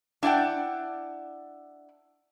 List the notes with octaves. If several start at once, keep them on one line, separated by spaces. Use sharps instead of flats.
D4 E4 D5 F#5 G5